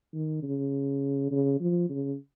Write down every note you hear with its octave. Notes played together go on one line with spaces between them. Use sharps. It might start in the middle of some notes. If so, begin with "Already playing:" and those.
D#3
C#3
C#3
F3
C#3